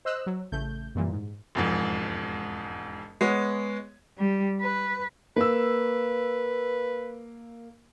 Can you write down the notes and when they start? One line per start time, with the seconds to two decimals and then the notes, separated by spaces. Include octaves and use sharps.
0.05 C5 D#5 E6 F#6
0.26 F#3
0.52 A1 C#3 A3 G6
0.95 F#2 A#2 E3 G3
1.12 G#2
1.55 E1 F2 G#2
3.21 G#3 B3 C#5
4.18 G3
4.61 B4
5.36 A#3 B4 E6